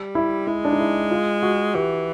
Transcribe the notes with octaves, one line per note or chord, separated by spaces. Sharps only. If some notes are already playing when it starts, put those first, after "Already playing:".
Already playing: G3
E4
G#3 E4
D4
D#4
E4
F4
F#4
E3 G4